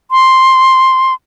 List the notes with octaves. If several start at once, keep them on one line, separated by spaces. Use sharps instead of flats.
C6